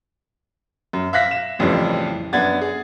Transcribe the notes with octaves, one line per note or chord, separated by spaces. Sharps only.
F#2
E5 F5 F#6 A#6 B6
E7
A1 F2 C#3 E3 G3
F#2 B3 D4 G#6 A6
G#4